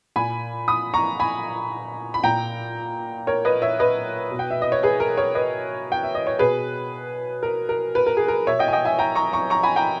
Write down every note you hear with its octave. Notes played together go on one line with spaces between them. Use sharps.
A#2 G#5 B5
B5 D#6
A#5 C#6
G#5 B5
B5
A#2 G5 A#5
A#4 C#5
B4 D#5
C#5 E5
B4 D#5
B2
G5
E5
D#5
C#5
G#4 B4
A#4
A#4 C#5
B4 D#5
G5
E5
D#5
C#5
B2 G#4 B4
A#4
A#4
B4
A#4
G#4
A#4
B2 C#5 E5
D#5 G5
G#5
D#5 G5
E5 G#5
G5 A#5
A#5 C#6
A#5 C#6
A#5 C#6
G#5 B5
G5 A#5